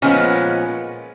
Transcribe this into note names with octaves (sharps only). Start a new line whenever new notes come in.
A#2 F3 G#3 B3 C#4